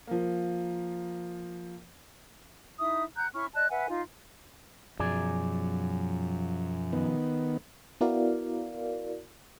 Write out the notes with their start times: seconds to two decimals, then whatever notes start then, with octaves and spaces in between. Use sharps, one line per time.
0.07 F3 A#3
2.79 D#4 E4 E5 D#6
3.16 F#5 A#5 F#6 G6
3.33 C#4 E4 C#6 F6
3.53 D5 D#5 A5 F#6
3.70 B4 E5 F#5 G#5
3.88 D#4 F4 F5
5.00 B1 F#2 F3 G#4 D5
6.93 D#3 B3
8.01 B3 E4 F#4 A#4 D5 F5